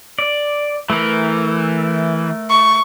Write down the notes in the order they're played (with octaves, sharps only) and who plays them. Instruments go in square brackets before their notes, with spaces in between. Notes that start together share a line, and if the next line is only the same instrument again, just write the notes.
[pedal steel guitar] D5
[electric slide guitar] E3 [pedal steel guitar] A3 A#4
[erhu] C#6